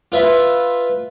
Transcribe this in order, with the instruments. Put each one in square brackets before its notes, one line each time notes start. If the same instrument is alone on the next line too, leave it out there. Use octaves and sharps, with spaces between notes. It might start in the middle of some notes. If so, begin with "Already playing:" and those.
[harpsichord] F4 B4 E5